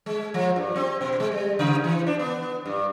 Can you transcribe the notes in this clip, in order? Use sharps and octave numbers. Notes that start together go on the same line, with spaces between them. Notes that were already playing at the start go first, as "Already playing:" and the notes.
G#3
F3
G2
C4
B2
G#3
G3
C#3
E3
D4
B3
G2